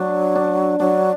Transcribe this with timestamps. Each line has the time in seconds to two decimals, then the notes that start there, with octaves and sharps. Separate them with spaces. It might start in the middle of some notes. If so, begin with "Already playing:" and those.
Already playing: F#3 D4
0.35 D4
0.80 F#3 D4